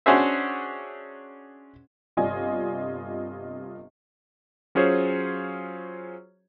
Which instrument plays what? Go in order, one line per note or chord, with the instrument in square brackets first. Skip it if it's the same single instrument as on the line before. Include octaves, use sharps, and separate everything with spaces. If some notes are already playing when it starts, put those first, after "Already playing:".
[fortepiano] C#4 D4 F#4 G#4 C5 E5
[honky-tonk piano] G1 C3 F4 D5 D#5 G#5
[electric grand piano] F#3 C#4 F4 G#4 C5 C#5